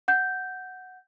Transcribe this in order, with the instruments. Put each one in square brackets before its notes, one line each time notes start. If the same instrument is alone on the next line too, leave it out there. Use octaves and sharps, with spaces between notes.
[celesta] F#5 G6